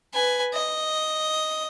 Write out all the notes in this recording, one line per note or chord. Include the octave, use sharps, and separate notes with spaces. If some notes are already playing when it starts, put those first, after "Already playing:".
B4 G#5
D#5